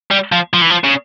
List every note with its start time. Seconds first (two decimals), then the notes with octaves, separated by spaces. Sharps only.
0.11 G3
0.32 F3
0.54 F3
0.62 E3
0.70 F3
0.84 C#3